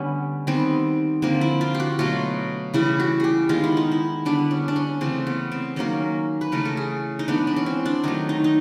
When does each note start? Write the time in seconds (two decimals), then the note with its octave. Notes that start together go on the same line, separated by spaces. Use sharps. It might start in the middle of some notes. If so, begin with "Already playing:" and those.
Already playing: D3 G3 B3 C#4
0.47 D#3 G3 B3 C4
1.22 D3 F3 A#3 C4
1.41 E4
1.61 F4
1.75 G4
1.80 F#4
1.99 B2 F#3 A3 F4
2.74 C#3 E3 G3 E4
3.00 F#4
3.20 G4 G#4
3.49 D#3 G#3 B3 F4
3.64 E4
3.77 D#4
3.92 E4
4.25 D3 G3 B3 D4
4.51 C#4
4.68 D4
4.76 C#4
5.01 C#3 E3 A3 C4
5.27 B3
5.52 C4
5.76 D#3 F#3 A#3 C#4
6.41 B4
6.52 C#3 E3 A3 A#4
6.65 A4
6.77 G#4
7.19 D#4
7.28 E3 G#3 B3 D4
7.47 D4
7.56 C#4
7.66 C4
7.86 D4
8.04 D#3 F#3 A3 D#4
8.29 D#4
8.44 D#4